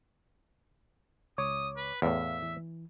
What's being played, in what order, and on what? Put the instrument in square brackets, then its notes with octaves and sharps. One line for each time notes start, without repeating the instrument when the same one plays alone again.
[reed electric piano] C#2 C#5 D6 [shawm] D#6
[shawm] B4
[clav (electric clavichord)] E2 A2 [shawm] E5 [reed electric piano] F5
[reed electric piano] E3